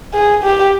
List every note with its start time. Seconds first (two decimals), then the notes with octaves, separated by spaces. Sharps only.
0.14 G#4
0.43 G4